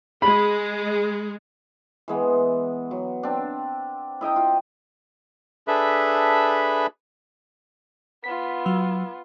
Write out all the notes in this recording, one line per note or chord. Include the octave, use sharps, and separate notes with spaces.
G#3 B5
E3 G#3 B3
F#3
C4 D4
E4 D#5 G5 A#5
F4
D4 G#4 A4 B4 E5 B5
B3 F4 B6
F#3 E6